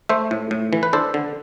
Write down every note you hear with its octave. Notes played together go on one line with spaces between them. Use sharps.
A3 C5 E5
A2
A2
E3
B4
D4 A4 C5
D3